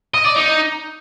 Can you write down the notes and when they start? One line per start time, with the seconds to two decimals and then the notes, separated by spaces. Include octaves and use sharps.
0.14 D#5
0.25 D5
0.36 D#4